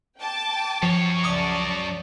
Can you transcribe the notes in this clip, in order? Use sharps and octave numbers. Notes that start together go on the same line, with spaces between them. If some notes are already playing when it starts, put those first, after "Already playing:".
G5 A5 D6
F#2 F3 C#5
C#2 D5 A5 D6 D#6